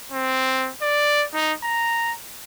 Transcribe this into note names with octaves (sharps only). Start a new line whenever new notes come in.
C4
D5
D#4
A#5